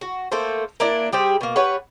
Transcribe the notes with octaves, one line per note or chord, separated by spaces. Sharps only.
F#4
A3 A#3 A4 C5
A#3 D4 E4 D5
G3 G4 G#4 C5
B2 A#3
G3 B4 C#5 F#5